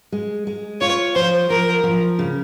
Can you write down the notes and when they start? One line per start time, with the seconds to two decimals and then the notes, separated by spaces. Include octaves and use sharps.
0.12 G#3
0.47 G#3
0.81 F4 C#5
1.15 F3 C5
1.50 F3 A#4
1.84 F3
2.19 C#3